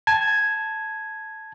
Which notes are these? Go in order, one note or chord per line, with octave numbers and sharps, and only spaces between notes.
A5 G#6